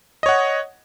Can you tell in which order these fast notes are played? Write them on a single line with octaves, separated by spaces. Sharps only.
D#5 C#5 F#5